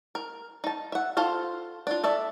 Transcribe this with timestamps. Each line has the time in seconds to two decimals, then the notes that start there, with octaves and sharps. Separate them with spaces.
0.15 A#4
0.64 D#4 A5
0.92 E5 F#5
1.17 F4 A4 C5 F5
1.87 D4 F4
2.04 A4 D5 E5